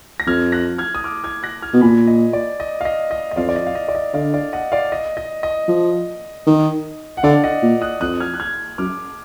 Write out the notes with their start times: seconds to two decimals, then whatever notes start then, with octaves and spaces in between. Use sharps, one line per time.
0.20 A#6
0.27 F2 F6 G#6
0.52 F#6 A#6
0.78 F6 G#6
0.95 D#6
1.04 D6 F6
1.24 F6 G#6
1.43 F#6 A#6
1.62 F6 G#6
1.74 B2
1.81 A#2 G#5 B5
2.07 D#5
2.33 D5
2.60 D#5
2.81 F5
2.85 D#5
3.11 D#5
3.31 D#5
3.36 F2 D5 F5
3.49 D5
3.56 D#5
3.67 F5
3.75 D#5
3.88 D5
3.95 D#5
4.14 D3 D5 F5
4.34 D5 F5
4.53 D#5 F#5
4.72 D5 F5
4.92 D#5
5.17 D#5
5.43 D#5
5.68 F3
6.47 D#3
7.17 F#5
7.23 D3 D5 F5
7.43 D#5 F#5
7.63 A#2
7.81 D#6 F#6
8.00 F2 D#6 F#6
8.20 F6 G#6
8.34 F#6
8.40 F6 G#6
8.78 F#2 D6 F6